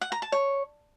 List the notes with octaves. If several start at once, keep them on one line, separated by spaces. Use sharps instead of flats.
F#5
A#5
A5
C#5